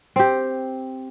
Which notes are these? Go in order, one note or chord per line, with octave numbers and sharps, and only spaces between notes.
C4 G4